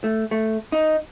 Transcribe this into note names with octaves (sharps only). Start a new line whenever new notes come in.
A3
A3
D#4